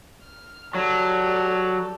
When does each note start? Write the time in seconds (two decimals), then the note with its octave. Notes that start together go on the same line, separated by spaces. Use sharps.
0.23 F6
0.75 F#3 G4 A4 D5